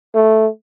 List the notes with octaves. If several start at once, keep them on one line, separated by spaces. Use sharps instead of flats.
A3